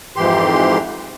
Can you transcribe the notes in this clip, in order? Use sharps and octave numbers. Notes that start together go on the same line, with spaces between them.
F2 G#2 E3 G4 C6